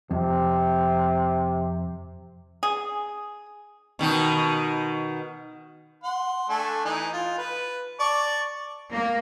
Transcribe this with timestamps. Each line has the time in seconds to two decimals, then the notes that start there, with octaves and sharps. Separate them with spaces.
0.11 F2 C3
2.63 G#4
3.99 B2 D#3 D#4
6.04 F#5 C6
6.49 A3 D4 G#5
6.85 E3 D#4
7.13 F4
7.38 B4
8.00 D5 A5 C#6
8.92 A#3